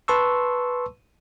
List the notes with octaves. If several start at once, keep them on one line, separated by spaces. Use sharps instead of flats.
B4 A5 C6 C#6 E6